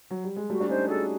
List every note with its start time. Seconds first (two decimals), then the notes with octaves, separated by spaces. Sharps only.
0.11 F#3
0.24 G3
0.36 G#3
0.50 G3 A3 F#4
0.60 D4
0.69 C#4 D#4 C5
0.88 F#4 G#4 A4